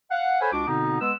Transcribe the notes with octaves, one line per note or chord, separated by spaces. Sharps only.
F5 F#5
A4 C5 C#5 F#5 G#5 B5
C#2 D4 F#4 D6
B2 D3 B3 C4 D#4
G#3 B3 B4 E6